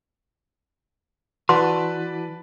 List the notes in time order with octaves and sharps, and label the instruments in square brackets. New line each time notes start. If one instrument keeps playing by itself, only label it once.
[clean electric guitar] E3 [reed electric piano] F#4 [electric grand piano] B4 D5 A5 [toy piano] C6